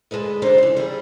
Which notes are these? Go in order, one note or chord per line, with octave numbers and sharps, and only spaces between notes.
D2 G#3 A4 B4 D#5
B2 D3 D4 D#4 C5 D5
C#3 E3
G3 E4 G#4